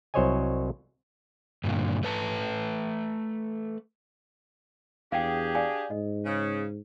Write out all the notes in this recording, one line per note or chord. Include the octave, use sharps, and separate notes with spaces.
C2 F#3 C5 C#5 D#5 G#5
G2 A#2 D3
A3 B4 A5
E2 D4 G4 G#4 F5 G5
D5 F5 G#5
G#2 D#5
C#3